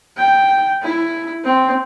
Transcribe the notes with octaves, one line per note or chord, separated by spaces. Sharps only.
G5
E4
C4